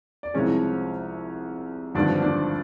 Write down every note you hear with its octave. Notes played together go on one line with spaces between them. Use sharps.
D5
C2 C3 F3 G#3 C#4 C#5
G#1 G2 D3 F3 D4 D5
D4 D5